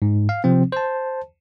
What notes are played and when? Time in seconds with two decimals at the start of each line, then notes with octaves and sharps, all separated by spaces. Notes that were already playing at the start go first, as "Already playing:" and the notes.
0.02 G#2
0.29 F5
0.44 C3 F3 C4
0.72 C5 A5